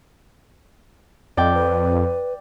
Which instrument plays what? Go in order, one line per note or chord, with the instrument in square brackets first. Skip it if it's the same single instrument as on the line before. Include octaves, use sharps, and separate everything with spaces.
[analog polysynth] F2 [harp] D5 G5 [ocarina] D#5
[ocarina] B4